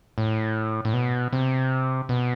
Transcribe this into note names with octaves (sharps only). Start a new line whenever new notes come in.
A2
A2
B2
C3
B2